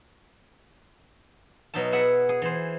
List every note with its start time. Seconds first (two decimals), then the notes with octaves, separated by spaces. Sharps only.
1.74 B2 F#3 D#4 E5 A5
1.92 B3 G#4 E5 F#5
2.29 G#4
2.42 E3 C5